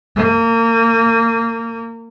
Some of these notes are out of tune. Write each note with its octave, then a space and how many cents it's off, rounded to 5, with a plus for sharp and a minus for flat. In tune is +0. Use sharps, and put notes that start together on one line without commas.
A#3 -30